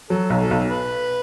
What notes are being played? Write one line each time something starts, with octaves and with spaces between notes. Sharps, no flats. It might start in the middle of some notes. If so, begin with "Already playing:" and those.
F#3 A4
B1
A4
B1
B4